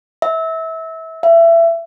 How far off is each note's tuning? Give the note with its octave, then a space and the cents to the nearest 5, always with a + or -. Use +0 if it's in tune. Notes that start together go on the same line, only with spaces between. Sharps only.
E5 -25
E5 +25